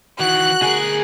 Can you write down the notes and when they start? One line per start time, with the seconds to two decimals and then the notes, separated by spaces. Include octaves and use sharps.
0.20 D#3 E3 F#4 F#6
0.62 D2 G#4 A#4